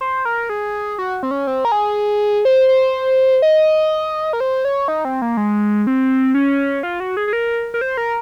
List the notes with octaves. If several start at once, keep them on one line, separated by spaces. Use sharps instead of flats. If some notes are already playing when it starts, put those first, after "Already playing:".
C5
A#4
G#4
F#4
C4
C#4
C4
A#4
G#4
C5
C5
D#5
A#4
C5
C#5
D#4
C4
A#3
G#3
C4
C#4
F4
F#4
G#4
G#4
A#4
A#4
C5
A#4